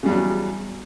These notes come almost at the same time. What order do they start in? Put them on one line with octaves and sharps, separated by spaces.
C#3 G3 E2 F#3